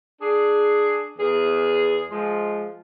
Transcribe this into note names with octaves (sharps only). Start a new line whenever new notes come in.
D4 G#4
E2 G#4
F3 G#3